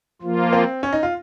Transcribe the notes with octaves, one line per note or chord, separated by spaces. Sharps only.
F3 A#3 F4
C4
C#4
D#4
F4